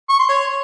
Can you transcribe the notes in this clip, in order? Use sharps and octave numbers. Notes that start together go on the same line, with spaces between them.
C#6
C6
C#5